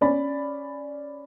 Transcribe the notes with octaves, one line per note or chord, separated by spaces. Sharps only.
C#4 D5 B5